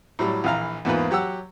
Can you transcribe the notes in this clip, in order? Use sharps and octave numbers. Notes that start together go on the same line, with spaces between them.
A2 F#3 G3
A#1 E3 F5 A#5
E2 G#2 A#3 F4 B4
F#3 G4 F#5 E6